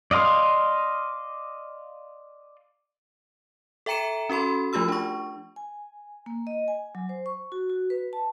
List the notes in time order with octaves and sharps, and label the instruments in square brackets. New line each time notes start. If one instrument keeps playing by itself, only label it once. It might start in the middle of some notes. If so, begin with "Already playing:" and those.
[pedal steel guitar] D5 D#5 F5 C6 D#6
[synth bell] A4 E5 G5 A#5 C#7 E7
C#4 F#4 A4 B5 C6
F3 A3 F4 G4 B5 E6
D4 C#6
[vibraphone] G#5
A#3
D#5
G#5
F#3
C5
C#6
F#4
F#4
B4
A5